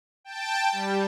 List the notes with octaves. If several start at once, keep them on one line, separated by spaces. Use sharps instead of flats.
G5 A5
G3